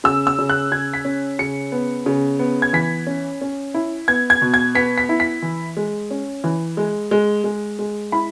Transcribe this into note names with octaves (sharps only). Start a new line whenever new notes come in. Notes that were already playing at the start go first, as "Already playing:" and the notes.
C#3 E6
E6
C#3
F#6
C#3 G#6
B6
C#4
C#3 C#7
B3
C#3
B3
G#6
E3 B6
C#4
C#4
E4
B3 G#6
G#6
B2
G#6
B3 B6
B6
E4
B6
E3
G#3
C#4
E3
G#3
G#3
G#3
G#3
E4 B5